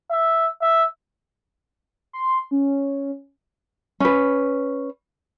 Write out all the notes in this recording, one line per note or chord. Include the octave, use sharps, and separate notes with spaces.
E5
E5
C6
C#4
C#4 B4